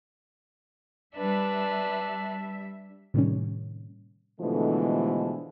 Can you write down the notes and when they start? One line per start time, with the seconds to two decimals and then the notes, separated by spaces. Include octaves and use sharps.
1.16 G3 D4 B4 E5
3.14 A2 C3 D#3 G3 A#3 C#4
4.40 B2 D3 E3 F3 G#3 A3